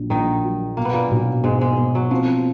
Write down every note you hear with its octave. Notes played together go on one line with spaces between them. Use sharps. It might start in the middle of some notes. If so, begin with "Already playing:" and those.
Already playing: A#1 F#3
A#1 D#3 D#4
F#3
B2 A#3
B3
A#2 A#3
B1
G#2 B2 G#3
G#2 G#3
B2
F#3
F3 C4